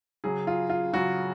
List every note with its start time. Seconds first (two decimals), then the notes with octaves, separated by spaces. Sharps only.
0.24 C#3 F#3 G#4
0.47 F4
0.70 F4
0.93 C#3 F#3 F#4